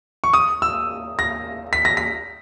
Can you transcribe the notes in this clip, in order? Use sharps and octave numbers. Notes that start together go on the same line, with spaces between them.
C#6
D#6
E6
A#6
B6
A#6
B6